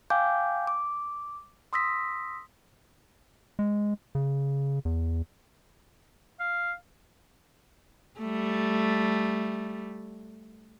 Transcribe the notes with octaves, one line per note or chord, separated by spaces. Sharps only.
F5 G5 G#5 D6 G6
D6
C6 D#6 E6 A#6 B6
G#3
C#3
E2
F5
G3 A3